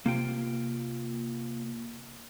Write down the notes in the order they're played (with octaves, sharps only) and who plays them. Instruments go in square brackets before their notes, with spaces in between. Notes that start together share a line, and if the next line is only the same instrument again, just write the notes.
[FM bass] C3 [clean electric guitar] A#3 F4 G5